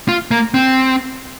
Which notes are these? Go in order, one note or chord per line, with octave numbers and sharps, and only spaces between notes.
F4
A#3
C4